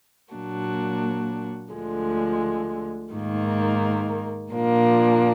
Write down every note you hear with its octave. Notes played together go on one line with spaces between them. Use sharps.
A#2 F#3 A#3 D4 F#4
D2 D3 F3 G#3
G#2 D#3 A#3
A#2 F3 A#3 D4